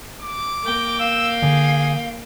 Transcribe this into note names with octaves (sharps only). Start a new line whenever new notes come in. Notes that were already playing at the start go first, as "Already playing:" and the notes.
D6
A#3 G5
F5 E6
D3 G#4